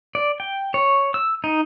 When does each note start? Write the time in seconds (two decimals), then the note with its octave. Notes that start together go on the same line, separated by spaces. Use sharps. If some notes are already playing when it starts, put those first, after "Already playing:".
0.15 D5
0.40 G5
0.74 C#5
1.14 E6
1.44 D#4